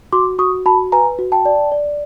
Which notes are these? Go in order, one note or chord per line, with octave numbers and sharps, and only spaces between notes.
F#4 C6 D6
F#4 C#6 D#6
F#4 A5 B5
B4 G#5 A#5
F#4
G5 A5
D5
D5